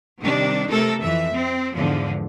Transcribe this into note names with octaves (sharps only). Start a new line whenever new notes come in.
C3 D#3 G3 D4
C3 A3 A4 A#4
F2 E3 E5
C4
E2 G#2 D3 F3